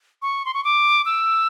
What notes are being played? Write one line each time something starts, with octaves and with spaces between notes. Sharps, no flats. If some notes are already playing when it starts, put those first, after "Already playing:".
C#6
C6
C#6
D6
E6